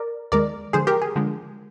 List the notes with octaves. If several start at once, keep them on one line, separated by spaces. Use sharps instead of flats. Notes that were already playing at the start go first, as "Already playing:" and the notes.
Already playing: A#4 D5
D#2 D#3 G#3 A#4 D5
D3 F3 G#3 G#4 C5
G4 A#4
G#4
D3 F3 G#3